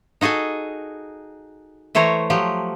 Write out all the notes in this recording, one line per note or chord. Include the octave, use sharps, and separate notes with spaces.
D#4 F#4 G#4 A4 G#5
E3 A3 C5 C#5 A#5
F3 F#3 G4